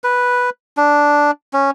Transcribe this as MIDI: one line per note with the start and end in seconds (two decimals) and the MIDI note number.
0.04 0.50 71
0.77 1.31 62
1.53 1.71 61